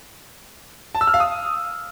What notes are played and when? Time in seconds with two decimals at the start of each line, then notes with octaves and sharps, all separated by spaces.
0.95 A5
1.01 E6
1.07 F6
1.14 F5
1.20 D#6